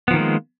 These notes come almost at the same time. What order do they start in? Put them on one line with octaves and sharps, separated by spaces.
B3 F3 D#3 A#3 G#3